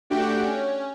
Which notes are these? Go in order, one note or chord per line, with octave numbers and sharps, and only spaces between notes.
A3 D4 F#4 G4 G5
C#4